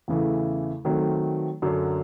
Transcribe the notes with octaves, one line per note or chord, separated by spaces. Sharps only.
E2 C#3 E3 A3
D#3 F#3 A3 C4
F#2 D3 F#3